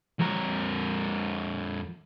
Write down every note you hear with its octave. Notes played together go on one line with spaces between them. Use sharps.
F2 A#4